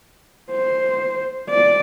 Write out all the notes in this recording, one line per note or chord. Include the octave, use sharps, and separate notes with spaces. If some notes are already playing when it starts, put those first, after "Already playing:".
C5
D5